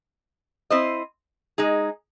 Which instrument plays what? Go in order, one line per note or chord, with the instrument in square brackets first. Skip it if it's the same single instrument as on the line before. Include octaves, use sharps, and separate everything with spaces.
[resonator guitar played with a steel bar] C4 E4 C5 D#5
G#3 D#4 G#4